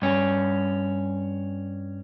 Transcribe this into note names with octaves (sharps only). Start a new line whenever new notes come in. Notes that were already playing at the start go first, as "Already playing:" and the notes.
G2 C#4